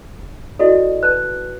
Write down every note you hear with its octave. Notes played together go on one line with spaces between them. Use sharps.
E4 F#4 A4 D5 D#5
B4 D5 A5 F#6